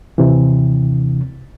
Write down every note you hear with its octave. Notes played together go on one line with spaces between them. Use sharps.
D#2 C3 E3